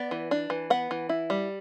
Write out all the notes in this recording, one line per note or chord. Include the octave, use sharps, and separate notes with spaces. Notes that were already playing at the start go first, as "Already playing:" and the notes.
Already playing: B3 D5
E3
D4
E3
B3 F#5
E3
E4
G3